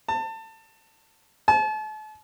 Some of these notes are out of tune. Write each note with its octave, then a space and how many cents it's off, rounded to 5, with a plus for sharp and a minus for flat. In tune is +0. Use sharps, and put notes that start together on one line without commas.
A5 +25
A5 -40